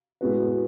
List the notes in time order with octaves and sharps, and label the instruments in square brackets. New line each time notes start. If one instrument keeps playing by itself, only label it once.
[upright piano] A2 G#3 B3 F#4 B4